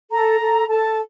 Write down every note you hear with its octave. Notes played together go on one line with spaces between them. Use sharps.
A4 A#5
A4
A4 A5